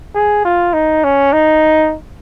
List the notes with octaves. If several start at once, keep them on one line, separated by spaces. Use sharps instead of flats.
G#4
F4
D#4
C#4
D#4